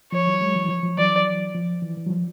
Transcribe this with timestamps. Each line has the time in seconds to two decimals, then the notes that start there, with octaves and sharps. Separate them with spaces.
0.12 F3 C#5
0.27 E3 F#3
0.41 F#3 G#3
0.56 E3 F#3
0.69 F3
0.83 F3
0.98 E3 F#3 D5
1.55 F3
1.82 E3
1.97 E3
2.07 F#3
2.10 F3